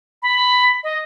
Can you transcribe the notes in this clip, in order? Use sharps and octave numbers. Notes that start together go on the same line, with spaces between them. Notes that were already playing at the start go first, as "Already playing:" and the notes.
B5
D#5